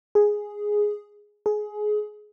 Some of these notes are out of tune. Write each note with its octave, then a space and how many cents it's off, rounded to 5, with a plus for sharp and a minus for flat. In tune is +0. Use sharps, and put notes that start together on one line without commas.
G#4 +0
G#4 +20